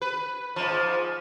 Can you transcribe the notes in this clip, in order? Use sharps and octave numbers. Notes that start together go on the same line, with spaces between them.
B4
G#2 F3